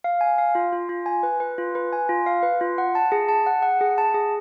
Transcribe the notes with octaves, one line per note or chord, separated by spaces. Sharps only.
F5
G#5
F5
F4
F4
F4
G#5
B4
B4
F4
B4
G#5
F4
F5
B4
F4
F#5
A5
G#4
A5
F#5
F#5
G#4
A5
G#4